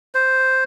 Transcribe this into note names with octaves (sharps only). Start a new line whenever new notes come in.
C5